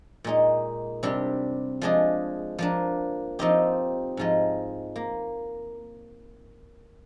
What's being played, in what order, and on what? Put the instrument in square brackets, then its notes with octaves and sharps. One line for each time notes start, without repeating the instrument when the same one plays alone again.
[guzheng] A#2 G#3 D#4
C3 G3 D4 G4
F3 G#3 D4 G#4
F3 A#3 D4
F3 C4 D#4 G4
G#2 F3 G#3
A#3